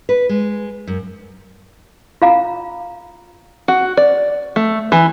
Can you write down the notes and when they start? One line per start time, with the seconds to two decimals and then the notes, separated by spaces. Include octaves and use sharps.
0.09 B4
0.29 G#3
0.87 F#2
2.22 F4 F5 A#5
3.68 F#4
3.97 D5
4.56 A3
4.92 E3